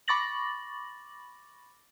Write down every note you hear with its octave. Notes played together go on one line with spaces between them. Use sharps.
B5 C#6 D6 A6 A#6 F#7